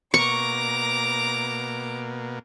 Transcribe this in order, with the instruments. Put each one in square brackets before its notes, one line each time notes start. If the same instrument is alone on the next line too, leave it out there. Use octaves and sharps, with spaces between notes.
[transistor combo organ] B2 A#3 [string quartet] A#5 D6 [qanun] C#6